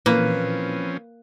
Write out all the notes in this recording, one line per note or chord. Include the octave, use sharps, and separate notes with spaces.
A#2 E3 F3 A#3 C4 C#4 B4